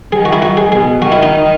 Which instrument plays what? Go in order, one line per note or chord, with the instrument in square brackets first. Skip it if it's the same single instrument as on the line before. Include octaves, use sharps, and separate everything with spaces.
[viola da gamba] D#3 [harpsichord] G#4
[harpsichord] F#4
E4
F#4
G#4
[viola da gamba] B2 [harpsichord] G#4
[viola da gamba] D#3 [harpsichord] F#4
[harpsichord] E4
D#4